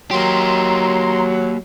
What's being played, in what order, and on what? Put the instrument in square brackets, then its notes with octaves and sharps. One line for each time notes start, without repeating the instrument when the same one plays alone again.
[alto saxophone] F#3 [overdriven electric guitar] A#3 G4 [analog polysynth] A#5 C6